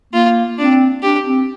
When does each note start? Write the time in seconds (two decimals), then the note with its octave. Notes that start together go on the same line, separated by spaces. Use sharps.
0.13 A#3 F4
0.58 C4 D4
1.03 D4 G4
1.26 C4